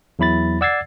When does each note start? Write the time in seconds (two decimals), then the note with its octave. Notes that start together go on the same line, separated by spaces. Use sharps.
0.19 E2 F#3 E4 B5 A6
0.61 D5 F#5 E6 G#6 A6 C7